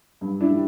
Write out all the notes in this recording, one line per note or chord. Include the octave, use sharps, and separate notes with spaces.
G2
D4 E4
D#3 G3